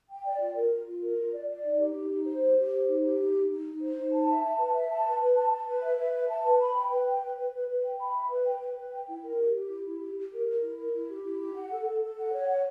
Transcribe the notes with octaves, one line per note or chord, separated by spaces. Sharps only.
G5
D5
F4
A#4
F4
F4
A#4
F4
D5
D5
D#4
G4
D#4
D#4
C5
G4
G4
C5
D#4
G4
D#4
D#4
D#4
D#4
C5
D#4
A5
E5
A5
B4
E5
A5
B4
B4
A5
A5
B4
E5
B4
E5
A5
B4
B5
G5
B4
G5
B4
B4
B4
B4
G5
B5
E5
B4
G5
B4
B4
G5
E4
A#4
G4
G4
E4
E4
G4
G4
A#4
A#4
E4
A#4
E4
G4
E4
G4
F#5
A4
A4
A4
F#5
C#5
F#5